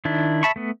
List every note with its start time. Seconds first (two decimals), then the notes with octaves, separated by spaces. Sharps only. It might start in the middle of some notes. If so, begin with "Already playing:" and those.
0.05 D#3 D4 E4
0.43 E5 A5 B5 C#6
0.56 A3 B3